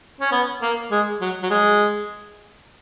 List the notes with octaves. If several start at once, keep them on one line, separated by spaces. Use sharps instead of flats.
C#4
B3
A#3
G#3
F#3
F#3
G#3